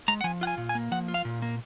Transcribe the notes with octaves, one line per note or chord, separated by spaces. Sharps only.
G#3 A#5
F#5
F3 G#5
F4 F#5
G#5
A#2
G#5
A#3
F3 F#5
F4
F5
A#2
A#3